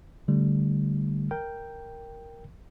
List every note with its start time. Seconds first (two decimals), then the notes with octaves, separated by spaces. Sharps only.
0.28 D3 G3 A3
1.31 A#4 G5